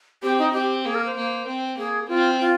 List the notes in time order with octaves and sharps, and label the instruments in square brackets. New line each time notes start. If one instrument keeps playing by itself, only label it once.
[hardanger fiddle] C4 [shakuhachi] G4
[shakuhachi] D#4
[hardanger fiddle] C4 [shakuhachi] G4
[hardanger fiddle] A#3 [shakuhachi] G#4
[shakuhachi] A#4
C5
[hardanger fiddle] A#3
C4
[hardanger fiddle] A#3 [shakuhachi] G#4
[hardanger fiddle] C4 [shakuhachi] F4
[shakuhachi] F4